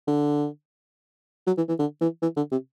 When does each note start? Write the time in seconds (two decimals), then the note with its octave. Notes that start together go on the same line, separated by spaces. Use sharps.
0.08 D3
1.47 F#3
1.57 E3
1.69 E3
1.79 D3
2.01 E3
2.22 E3
2.37 D3
2.52 C3